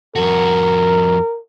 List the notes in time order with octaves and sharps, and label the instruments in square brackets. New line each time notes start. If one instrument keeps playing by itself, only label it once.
[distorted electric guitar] F2 F#4 [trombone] A#4